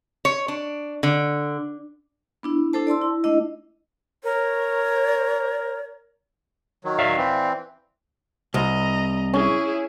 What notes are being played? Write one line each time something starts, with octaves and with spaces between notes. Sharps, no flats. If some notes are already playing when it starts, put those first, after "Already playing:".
C#5
D4
D3
B3 D4 E4
D4 E4 A4 C5 A5
D5 A5 C6 E6
E4
A3 D4 E4 D#5
A#4 C#5
D#3 F#3
D5 E5 F5
E3 C4
C2 D#5 A#5
C#4 E4 G#4